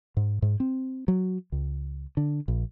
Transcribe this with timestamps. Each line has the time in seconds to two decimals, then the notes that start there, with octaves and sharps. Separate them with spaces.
0.17 G#2
0.42 G#2
0.60 C4
1.08 F#3
1.52 C#2
2.17 D3
2.48 A#1